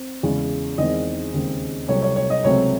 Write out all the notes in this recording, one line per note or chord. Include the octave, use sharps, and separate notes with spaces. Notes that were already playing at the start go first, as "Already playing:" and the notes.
Already playing: C4
E2 C#3 G#3
E2 D#3 G#3 C4 D#5
D#2 C#3 G#3 C4
C2 C3 F#3 A3 C4 C#5
C#5
C#5
D#5
C#2 C3 F#3 A3 C4 C#5